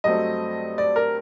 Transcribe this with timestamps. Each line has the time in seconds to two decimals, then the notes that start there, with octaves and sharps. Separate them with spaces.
0.04 G2 F#3 A3 C4 D#5
0.78 D5
0.96 A#4